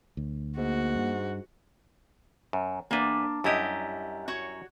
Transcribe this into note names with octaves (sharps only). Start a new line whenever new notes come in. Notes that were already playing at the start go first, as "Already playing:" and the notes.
D2
G#2 A#3 F#4
G2
F#2
E2 A#3 D4 B4
F#2 G3 E4 G4 D#5
F#4 C#5